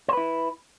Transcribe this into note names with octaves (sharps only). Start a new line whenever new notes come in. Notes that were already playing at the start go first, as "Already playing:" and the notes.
E4 B4 C5